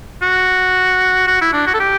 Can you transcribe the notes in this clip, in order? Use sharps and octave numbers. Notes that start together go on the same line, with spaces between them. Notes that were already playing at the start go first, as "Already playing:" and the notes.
F#4
F#4
E4
D4
F#4
A4
G4